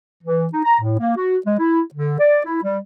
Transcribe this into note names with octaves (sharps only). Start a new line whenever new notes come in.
E3
D#4
A#5
A2
A#3
F#4
G#3
E4
D3
D5
E4
G3